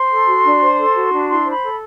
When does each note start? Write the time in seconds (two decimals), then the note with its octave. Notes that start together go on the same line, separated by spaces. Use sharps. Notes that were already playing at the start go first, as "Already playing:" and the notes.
Already playing: C5 C6
0.11 A4
0.27 F#4
0.45 D4
0.61 C5
0.78 A4
0.95 F#4
1.13 D4
1.29 E4 C6
1.46 C5
1.51 B5
1.62 A4